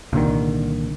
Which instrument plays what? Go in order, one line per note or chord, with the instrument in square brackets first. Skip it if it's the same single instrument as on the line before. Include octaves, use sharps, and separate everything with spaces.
[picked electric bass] C2 A#2 D3 D#3